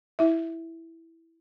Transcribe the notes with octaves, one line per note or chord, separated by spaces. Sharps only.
E4 E5